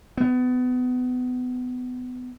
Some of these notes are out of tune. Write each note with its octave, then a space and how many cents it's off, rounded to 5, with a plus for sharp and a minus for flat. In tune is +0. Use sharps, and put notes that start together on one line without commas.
B3 +25